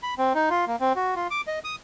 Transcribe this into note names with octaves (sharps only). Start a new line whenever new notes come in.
B5
C4
D#4
F4
A#3
C4
F#4
F4
D6
D#5
D#6